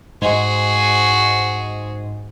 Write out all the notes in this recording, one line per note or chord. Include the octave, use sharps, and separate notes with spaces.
G#2 F#4 G#4